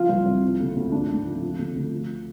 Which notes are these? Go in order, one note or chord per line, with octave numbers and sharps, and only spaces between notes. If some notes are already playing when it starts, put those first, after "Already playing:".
Already playing: F3 F4
C2
C2
F3
D2
D2
G#2 D4
G#2
F3
F3
D2
D2
F3